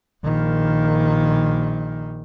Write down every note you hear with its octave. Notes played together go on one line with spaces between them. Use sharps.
A#1 D#3